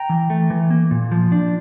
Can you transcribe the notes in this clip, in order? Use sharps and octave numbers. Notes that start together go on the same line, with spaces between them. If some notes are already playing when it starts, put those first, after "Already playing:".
Already playing: G5 A#5
E3
A3
E3
A#3
A#2
F3
D4